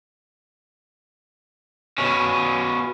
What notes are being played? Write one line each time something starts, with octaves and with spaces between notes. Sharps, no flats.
B2 C#4